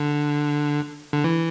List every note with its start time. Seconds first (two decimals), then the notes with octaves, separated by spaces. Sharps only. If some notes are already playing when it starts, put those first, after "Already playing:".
Already playing: D3
1.13 D3
1.24 E3